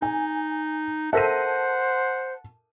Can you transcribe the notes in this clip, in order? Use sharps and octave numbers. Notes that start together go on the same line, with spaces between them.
D#4 G#5
A4 A#4 C5 E5 F#5 A5 A#6 D#7